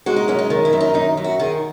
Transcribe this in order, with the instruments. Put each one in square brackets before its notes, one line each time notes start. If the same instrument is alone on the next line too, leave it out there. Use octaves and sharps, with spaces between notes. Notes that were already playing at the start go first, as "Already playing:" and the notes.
[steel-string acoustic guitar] G#3 F#4
D#4
F#2 C#4
D#4
D#3
E4
F#2
D#4
F#2 D#4
F#2
F#4
D#3 G#4